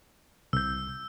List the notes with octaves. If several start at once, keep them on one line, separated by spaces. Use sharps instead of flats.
C2 E6 G6